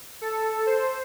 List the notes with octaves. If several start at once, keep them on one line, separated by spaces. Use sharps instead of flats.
A4
C5